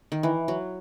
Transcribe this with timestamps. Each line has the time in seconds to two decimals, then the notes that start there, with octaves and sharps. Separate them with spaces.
0.12 D#3
0.23 E3
0.48 F#3